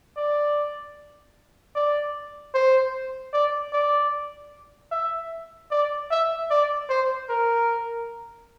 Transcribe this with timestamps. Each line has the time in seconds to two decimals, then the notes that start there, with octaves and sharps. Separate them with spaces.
0.17 D5
1.75 D5
2.55 C5
3.33 D5
3.73 D5
4.92 E5
5.71 D5
6.11 E5
6.51 D5
6.90 C5
7.30 A#4